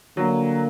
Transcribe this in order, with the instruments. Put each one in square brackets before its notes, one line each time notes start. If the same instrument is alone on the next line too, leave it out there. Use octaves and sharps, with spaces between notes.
[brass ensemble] D3 G3 A#3 [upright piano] F#3